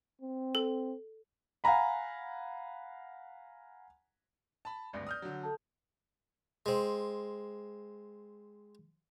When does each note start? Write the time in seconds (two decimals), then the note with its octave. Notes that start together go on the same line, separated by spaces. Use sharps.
0.21 C4
0.55 A4
1.64 F5 F#5 G#5 A#5 B5
4.65 A5 B5
4.93 G#1 D2 G2 D5 A#6
5.07 D#6 F6 G6
5.22 D3 F#3
5.43 A4 A5
6.66 G#3 C4